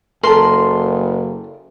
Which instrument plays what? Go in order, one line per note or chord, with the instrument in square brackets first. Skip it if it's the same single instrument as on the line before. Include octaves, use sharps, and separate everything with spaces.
[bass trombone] F#1 [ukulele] A4 A#4 [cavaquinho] C6